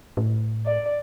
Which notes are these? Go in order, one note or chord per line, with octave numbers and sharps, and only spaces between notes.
A2
D5